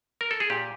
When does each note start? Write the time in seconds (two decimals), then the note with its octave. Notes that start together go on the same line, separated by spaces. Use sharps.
0.21 A#4
0.31 A4
0.40 G#4
0.50 A#2 G4